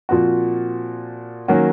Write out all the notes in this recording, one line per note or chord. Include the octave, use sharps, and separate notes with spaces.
A#2 F3 C4 F#4
D#3 F#3 A#3 C#4 F#4